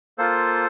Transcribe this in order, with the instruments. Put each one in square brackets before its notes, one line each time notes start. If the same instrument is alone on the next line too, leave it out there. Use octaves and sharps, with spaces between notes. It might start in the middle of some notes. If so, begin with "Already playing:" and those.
[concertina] A#3 F4 A4 C5